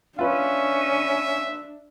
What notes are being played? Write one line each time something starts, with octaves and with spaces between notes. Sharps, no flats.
C#4 D4 F4 B4 E5